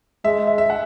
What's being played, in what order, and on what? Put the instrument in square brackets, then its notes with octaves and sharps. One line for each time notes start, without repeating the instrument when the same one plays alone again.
[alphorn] G#3 [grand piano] E5
[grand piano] E5
E5
F#5